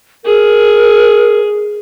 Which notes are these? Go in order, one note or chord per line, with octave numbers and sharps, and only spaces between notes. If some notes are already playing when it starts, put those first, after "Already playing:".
G#4 A#4